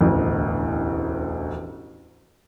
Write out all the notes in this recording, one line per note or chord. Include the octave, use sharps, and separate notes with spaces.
E1 A1 D2